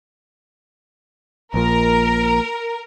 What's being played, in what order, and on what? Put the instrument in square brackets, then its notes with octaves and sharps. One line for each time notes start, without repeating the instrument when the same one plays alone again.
[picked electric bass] A#1 A#2 [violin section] A#4